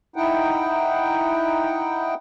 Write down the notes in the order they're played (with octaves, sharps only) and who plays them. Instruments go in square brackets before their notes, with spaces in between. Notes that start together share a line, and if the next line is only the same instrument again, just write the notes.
[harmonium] D#4 E4 F#5 G5